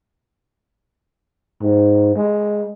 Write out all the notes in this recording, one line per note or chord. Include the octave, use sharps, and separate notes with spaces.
G#2
G#3